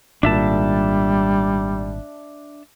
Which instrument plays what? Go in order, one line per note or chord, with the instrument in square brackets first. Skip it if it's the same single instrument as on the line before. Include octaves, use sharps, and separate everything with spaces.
[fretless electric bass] G#1 A#2 [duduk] G3 [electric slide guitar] D4 E5 A5